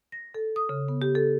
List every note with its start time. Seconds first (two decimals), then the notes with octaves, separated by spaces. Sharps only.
0.12 A#6
0.34 A4
0.56 D#6
0.69 C#3
0.88 B3
1.02 G4
1.15 A4